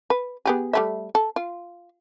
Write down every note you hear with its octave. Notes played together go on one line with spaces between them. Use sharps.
B4
B3 G4 G#4
G3 A3 E5
A4
F4